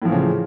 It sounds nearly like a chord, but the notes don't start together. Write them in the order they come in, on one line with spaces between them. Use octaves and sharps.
A2 F3 E3 C#3